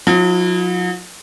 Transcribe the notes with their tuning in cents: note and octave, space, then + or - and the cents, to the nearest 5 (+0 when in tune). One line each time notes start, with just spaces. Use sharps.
F#3 -45 E4 +0